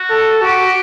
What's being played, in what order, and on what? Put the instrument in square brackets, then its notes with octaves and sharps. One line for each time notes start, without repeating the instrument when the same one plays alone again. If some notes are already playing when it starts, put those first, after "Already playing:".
Already playing: [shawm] F#4
[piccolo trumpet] A4
[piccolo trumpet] F#4 [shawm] G4